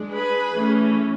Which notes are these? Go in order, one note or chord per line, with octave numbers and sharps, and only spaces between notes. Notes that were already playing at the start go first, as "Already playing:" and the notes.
Already playing: G#3 D4
G#4 B4
E3 A3 C#4